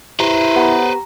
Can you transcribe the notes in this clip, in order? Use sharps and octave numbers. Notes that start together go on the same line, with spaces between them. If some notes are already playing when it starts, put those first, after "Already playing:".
E4 G4 B4 C5 A#5
B3 G4 A#5